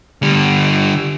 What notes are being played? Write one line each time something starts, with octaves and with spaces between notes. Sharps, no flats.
D3 G3